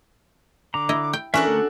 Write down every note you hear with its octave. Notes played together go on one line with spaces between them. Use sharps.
D3 A#5 D6
E4 D#5
G5
E3 C#4 D4 F#4 A4 A#4 E5
D3 A3